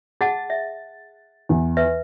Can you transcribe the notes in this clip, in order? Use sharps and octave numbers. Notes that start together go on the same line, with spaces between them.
G#4 F#5 A5 A6
E5
E2
B4 E5